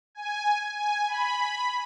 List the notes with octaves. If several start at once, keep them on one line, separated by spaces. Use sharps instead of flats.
G#5
G#5
B5